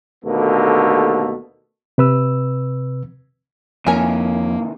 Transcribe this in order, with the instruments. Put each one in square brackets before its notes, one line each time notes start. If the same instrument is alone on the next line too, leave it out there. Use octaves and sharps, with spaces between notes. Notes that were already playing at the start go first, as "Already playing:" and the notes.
[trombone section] D#2 B2 D3 A3 A#3
[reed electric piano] C3 B4 E6
[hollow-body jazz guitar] F2 [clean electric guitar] C3 D#3 E3 [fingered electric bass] A#3 [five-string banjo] C#4 A#4 G#5